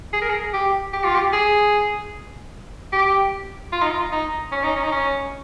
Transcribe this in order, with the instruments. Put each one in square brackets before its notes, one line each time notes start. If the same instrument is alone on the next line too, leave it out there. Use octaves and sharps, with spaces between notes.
[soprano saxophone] G#4
A#4
G#4
G4
G4
F4
G4
G#4
G4
F4
D#4
F4
D#4
C#4
D#4
C#4
D#4
C#4